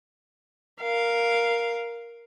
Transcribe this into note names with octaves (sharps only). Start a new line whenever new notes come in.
A#4 F5